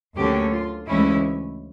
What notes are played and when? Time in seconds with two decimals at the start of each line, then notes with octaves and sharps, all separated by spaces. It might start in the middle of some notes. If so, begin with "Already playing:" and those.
0.15 D2 D3 F#3 A#3 C#4 G4
0.52 F4
0.87 D2 C#3 E3 G#3 C#4 E4